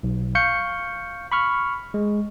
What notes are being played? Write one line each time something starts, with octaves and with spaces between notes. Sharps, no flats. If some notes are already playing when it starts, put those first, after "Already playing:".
B1
F5 C#6 G6 C#7
B5 C#6 F6
G#3